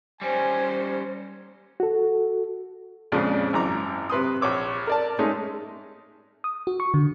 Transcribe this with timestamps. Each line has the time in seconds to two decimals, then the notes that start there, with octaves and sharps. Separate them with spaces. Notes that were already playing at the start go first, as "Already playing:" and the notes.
0.21 G3 C#4 C5 G#5
1.80 F#4 A4
3.12 F2 A#2 C#3 G#3 D4
3.53 G#1 F#2 E3 A#5 D6
4.10 C3 B4 C6 D#6
4.41 A#1 C#5 D6 E6
4.87 A#4 D5 A5
5.19 G#3 A3 C#4 D#4
6.44 D#6
6.67 F#4
6.80 C#6
6.94 D3